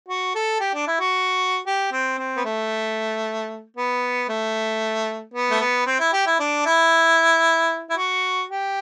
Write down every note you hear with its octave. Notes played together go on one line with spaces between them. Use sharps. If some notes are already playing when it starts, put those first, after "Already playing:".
F#4
A4
G4
D4
E4
F#4
G4
C4
C4
B3
A3
B3
A3
B3
A3
B3
C4
E4
G4
E4
D4
E4
E4
F#4
G4